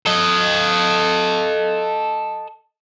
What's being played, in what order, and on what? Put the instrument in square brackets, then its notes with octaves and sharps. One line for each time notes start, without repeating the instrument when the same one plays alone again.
[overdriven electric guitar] A4 D#5